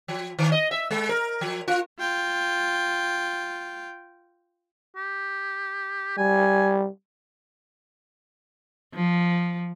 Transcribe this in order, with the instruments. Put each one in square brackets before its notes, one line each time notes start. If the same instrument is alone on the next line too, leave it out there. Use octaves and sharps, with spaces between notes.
[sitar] F3
D#3
D#5
E5
G#3
A#4
F3
F4
[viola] F4 G5
[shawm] G4
[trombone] G3 [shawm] G#5
[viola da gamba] F3